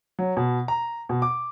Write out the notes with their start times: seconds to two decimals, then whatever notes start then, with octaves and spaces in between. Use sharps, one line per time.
0.19 F#3
0.37 B2
0.68 A#5
1.09 B2
1.22 D6